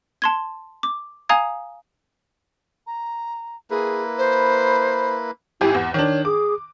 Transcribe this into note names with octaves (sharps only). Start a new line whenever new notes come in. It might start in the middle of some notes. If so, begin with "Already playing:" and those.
A5 C6 G#6
D6
F5 G#5 A#5 D#6 G#6
A#5
A#3 E4 G#4 B4
C5
G#1 E4 G4 G#5
E2 F#5
D#3 D4 C#5
G#4 D6